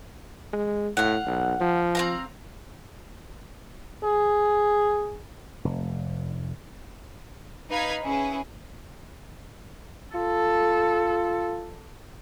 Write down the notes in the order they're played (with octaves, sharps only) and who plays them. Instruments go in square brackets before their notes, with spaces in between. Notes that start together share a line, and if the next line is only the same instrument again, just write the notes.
[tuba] G#3
[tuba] A2 [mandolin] F5 F#5
[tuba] B1
F3
[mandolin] C4 F5 A#5
[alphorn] G#4
[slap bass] F1
[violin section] D#4 B4 F5 B5 G#6
C#4 E4 G#4 B4
[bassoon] F4 [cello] A4